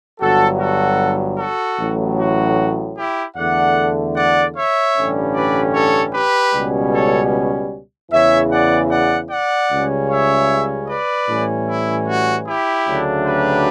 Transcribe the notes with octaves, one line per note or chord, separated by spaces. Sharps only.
G1 G2 F#3 F#4 A4
F#4 A4
F#4 A4
A1 A2 F#3
F#4
E4 G4
E2 D3 A3 D5 F#5
D5 F#5
C#5 E5
A1 G2 D3 G3 C#4
B4 D5
A4 C#5
G4 B4
C#2 B2 G3 C#4
A4 C#5
E2 C#3 E3 C#5 E5
D5 F#5
D5 F#5
D5 F#5
C#2 C#3 G3 C#4
C#5 E5
B4 D5
A2 E3 G3 C#4
E4
F#4
E4 G4
D2 C#3 F#3 A3 D4
G4 B4